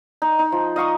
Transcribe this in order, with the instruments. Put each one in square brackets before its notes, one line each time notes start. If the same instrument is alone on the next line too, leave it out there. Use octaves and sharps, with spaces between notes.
[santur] D#4
D#4
F3
D#5 F5 C#6 D#6